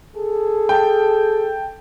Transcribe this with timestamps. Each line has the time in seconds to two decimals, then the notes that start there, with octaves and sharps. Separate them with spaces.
0.16 G#4 A4
0.69 G5 A5